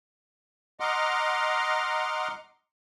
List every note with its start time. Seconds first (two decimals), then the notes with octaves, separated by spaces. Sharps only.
0.80 D#5 F#5 A#5 C6 D6 F6